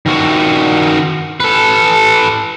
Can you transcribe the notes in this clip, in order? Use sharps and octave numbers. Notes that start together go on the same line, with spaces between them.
D#3 F#4
A4 B4